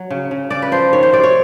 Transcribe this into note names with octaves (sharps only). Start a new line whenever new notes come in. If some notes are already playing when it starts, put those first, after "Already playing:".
Already playing: F#3
C#3
C#3
C#3 D5
B4
F3 C5
D#3 C#5
C5
C3 D5
C#5